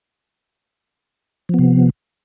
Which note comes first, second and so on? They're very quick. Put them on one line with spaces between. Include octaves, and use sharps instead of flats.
F3 B3 C3